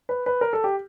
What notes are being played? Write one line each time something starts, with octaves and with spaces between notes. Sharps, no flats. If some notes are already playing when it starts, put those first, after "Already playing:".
B4
B4
A#4
A4
G4